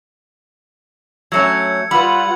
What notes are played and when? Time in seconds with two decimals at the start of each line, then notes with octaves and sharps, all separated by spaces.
1.32 F#3 A3 C#4 G#6 C#7
1.91 G3 F4 B4 F#5 B5 E6 F#7